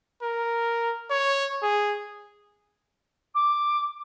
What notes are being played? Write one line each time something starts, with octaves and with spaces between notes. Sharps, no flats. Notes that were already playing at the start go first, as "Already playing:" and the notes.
A#4
C#5
G#4
D6